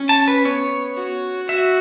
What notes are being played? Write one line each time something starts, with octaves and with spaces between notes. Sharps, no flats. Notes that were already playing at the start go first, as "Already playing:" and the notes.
Already playing: C#4
A5
B4
B3 C#5
F#4
F#4 E5